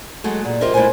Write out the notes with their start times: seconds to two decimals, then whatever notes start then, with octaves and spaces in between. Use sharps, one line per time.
0.24 F#3 G#3 A3
0.45 A#2
0.61 F4 G4 A#4 C5 D#5 E5
0.74 G#3 A3 E4 A#4 C5 G#5